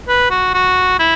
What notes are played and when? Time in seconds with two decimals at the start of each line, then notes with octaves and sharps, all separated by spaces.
0.08 B4
0.31 F#4
0.54 F#4
0.99 E4